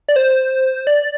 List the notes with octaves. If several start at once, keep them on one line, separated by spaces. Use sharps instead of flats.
D5
C5
D5